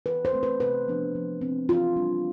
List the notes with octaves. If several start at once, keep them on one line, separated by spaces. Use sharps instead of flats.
E3 B4
C5
A3 C4
B4
C3 B4
F3 B3 D4
F3
C4
E3 F4
G3 D4